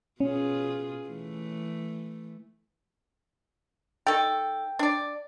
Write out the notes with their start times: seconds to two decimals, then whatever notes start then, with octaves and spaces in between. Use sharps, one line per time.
0.20 B2 C#4 F4 G#4
1.07 E3 A3
4.07 D#3 A4 G5
4.79 D4 D5